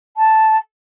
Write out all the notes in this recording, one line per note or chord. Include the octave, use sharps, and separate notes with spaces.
A5